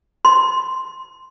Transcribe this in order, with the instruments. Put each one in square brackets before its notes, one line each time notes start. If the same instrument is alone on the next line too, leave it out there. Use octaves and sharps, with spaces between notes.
[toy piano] C6